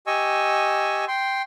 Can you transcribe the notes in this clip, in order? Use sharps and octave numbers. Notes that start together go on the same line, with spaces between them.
G4 D#5 G#5 C#6 E6
G5 C6